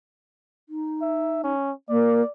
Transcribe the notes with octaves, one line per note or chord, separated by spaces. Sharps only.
D#4
E5
C#4
A#3 D5